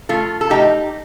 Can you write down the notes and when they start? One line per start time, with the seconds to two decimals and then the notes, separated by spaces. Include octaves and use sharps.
0.09 A2 F3 A3 F4 A4
0.41 A4
0.50 A2 F3 A3 D#4 G4